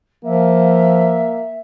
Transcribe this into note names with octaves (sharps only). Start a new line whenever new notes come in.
F3 A#3 E5